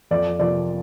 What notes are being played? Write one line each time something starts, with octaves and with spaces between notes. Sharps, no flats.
F2 D5
C3 F3 A#3 D5